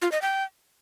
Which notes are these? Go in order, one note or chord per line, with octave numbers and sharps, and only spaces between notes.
F4
D#5
G5